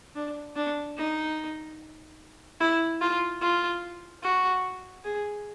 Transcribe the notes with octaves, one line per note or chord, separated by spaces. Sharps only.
D4
D4
D#4
E4
F4
F4
F#4
G#4